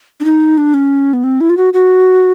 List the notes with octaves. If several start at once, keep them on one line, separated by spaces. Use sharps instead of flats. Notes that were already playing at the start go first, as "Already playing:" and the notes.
D4
D#4
D4
C#4
B3
C4
E4
F4
F#4
F#4